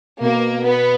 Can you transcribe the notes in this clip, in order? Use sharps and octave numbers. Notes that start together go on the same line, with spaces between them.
B2 A#3
B3